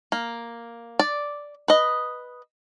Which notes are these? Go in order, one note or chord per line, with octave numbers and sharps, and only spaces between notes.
A#3
D5
B4 D#5